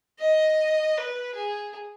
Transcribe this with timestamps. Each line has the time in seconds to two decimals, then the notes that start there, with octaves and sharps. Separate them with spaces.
0.20 D#5
0.97 B4
1.35 G#4